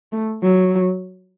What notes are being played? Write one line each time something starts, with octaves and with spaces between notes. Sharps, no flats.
A3
F#3